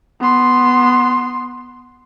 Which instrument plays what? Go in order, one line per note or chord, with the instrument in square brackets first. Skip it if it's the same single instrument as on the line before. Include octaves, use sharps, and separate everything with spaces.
[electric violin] B3 C6